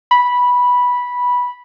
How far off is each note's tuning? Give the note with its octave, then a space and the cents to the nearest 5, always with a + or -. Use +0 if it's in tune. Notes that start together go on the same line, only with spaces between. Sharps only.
B5 -10